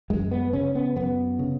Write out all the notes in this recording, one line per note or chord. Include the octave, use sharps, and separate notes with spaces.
F#2 G#3
B3
C#3 C#4
B3
F#2 B3
C#3